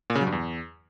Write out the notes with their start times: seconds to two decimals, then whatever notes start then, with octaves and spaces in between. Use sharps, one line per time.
0.10 A#2
0.15 C#3
0.21 F#3
0.27 G2
0.32 E2